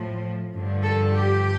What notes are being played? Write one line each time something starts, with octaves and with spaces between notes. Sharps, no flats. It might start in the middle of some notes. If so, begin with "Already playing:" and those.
Already playing: A2 F3
G2 D3 F3
A4
G4